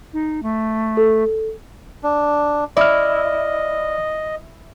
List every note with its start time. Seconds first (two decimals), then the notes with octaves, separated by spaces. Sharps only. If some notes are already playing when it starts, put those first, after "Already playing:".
0.13 D#4
0.43 A3
0.97 A4
2.04 D4
2.77 E4 D5 D#5 F6